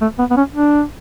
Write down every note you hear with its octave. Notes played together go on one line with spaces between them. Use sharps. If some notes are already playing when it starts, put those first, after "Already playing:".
A3
B3
B3
C#4
D4